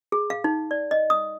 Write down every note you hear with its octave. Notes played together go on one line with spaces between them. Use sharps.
G#4
F5
D#4
D5
D#5
D#6